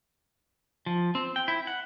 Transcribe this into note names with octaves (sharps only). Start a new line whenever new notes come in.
F3
C4
G5
E4
F#5